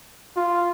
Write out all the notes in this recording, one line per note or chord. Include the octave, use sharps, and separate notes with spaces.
F4